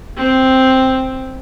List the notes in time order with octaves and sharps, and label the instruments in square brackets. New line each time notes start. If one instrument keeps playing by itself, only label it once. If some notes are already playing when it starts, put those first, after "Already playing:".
[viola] C4